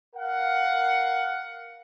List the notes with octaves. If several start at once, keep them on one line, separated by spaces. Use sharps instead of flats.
A#4 F5 F#5